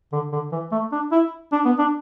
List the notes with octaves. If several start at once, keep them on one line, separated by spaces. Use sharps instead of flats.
D3
D3
E3
A3
D4
E4
D4
B3
D4